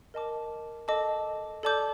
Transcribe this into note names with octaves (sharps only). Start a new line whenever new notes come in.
A#4 D#5 A5 D6
A4 D#5 A5 D6
A4 D5 A5 D6 G6